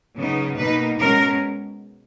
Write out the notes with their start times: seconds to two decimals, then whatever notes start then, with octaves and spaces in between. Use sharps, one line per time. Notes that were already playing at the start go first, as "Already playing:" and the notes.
0.16 C#3 F#3 B3 D#4
0.56 B2 A#3 D#4 B4
0.98 B2 G#3 C#4 A#4